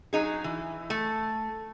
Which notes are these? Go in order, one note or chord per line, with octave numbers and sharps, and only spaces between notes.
F#3 D#4 G#4
E3
A3